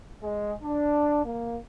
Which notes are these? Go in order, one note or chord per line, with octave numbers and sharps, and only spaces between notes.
G#3
D4
A#3